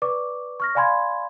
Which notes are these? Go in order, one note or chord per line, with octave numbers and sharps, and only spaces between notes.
B4 D5 C#6 D6
C#6 F6 A#6
D5 F5 G#5 B5 C6 G#6